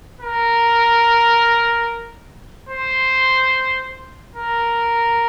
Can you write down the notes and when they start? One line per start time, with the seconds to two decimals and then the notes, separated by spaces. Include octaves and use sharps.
0.21 A#4
2.69 C5
4.35 A#4